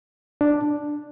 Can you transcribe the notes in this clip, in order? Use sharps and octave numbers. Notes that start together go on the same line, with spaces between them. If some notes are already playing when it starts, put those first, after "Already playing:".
D4